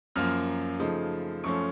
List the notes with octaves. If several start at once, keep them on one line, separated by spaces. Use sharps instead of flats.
F#2 F3 A#3 F6
C#3 F3 A3 D#4
F#2 F3 A3 C#4 C#6